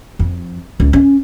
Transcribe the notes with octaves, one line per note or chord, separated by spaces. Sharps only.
F2
C#2
C#4